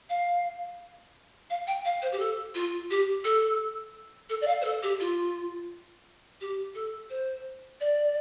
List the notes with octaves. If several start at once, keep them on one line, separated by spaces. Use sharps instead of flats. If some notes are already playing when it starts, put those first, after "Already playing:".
F5
F5
G5
F5
C5
G4
A4
F4
G4
A4
A4
D5
F5
C5
A4
G4
F4
G4
A4
C5
D5